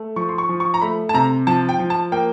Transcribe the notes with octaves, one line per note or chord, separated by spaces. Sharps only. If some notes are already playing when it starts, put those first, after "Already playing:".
Already playing: A3
F3 C#6
C6
C#6
F3
C#6
A#5
A3 B5
A5
C3 A#5
F3 A5
G5
F3
A5
A#3 G5